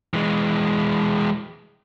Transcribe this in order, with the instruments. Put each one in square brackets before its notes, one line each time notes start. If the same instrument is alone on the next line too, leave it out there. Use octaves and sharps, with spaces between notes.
[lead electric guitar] E3 G#3